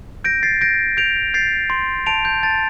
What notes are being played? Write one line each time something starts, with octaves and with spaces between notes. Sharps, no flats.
G6 A#6 D7
A6 C7
G6 A#6 D7
G6 D7 F7
G6 A6 C7
C6
A5 D7 F7
G6
A5 A6